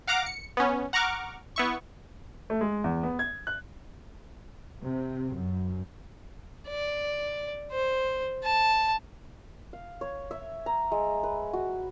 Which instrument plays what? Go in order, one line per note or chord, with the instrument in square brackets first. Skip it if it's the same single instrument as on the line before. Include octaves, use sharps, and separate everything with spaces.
[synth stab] F5 F#5 A#5 D6 F6
C#7
B3 C#4
F#5 A#5 C#6 D6 F6
B3 E4 C#6
[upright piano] A3
G#3
E2
B3
G#6
F#6
[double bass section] C3
F#2
[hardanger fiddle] D5
C5
A5
[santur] F5
C#5
E5
A#5
G#3
B4
F#4